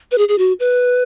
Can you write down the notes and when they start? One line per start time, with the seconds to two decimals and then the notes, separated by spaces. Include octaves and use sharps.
0.11 B4
0.18 G#4
0.29 G#4
0.38 F#4
0.60 B4